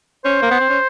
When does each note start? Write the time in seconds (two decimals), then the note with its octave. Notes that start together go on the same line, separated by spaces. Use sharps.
0.25 C#4 C5
0.42 A#3
0.51 B3
0.60 C4
0.70 C#4